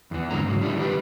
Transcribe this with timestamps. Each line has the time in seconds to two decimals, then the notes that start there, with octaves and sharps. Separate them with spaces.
0.11 E2 E3
0.31 G2 D3 G#3 C4 A#5
0.47 G#2 C#3 F#3
0.61 G3 D4 E4
0.76 D#3 G3 D4 G4 B4